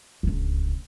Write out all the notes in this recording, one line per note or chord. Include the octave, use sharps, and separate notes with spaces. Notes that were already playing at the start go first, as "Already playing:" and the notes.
D1 C#2